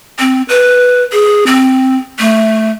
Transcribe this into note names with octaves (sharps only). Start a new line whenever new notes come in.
C4
B4
G#4
C4
A3